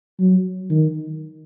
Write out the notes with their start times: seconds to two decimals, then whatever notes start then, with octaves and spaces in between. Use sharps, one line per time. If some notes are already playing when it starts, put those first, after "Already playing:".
0.20 F#3
0.70 D#3